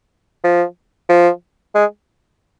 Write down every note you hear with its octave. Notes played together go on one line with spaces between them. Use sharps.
F3
F3
G#3